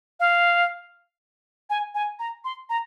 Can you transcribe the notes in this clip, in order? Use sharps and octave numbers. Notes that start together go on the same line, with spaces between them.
F5
G#5
G#5
A#5
C6
A#5